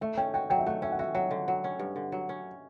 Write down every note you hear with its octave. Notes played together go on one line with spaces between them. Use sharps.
A3 E5
C#4 G5
F#4 G5
F#3 G5
E5
A3 F#5
C#4 E5
F#5
F#4 E5
F#3 F#5
D3
F#3
C#4
G2
D3
F#3
C#4